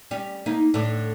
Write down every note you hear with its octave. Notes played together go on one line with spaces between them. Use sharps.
G3 C#4
A#3 D#4
A2 D3